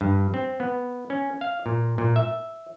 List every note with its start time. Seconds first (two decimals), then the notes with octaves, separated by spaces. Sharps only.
0.01 G2
0.34 C4
0.60 B3
1.10 C#4
1.41 F5
1.66 A#2
1.98 A#2
2.16 E5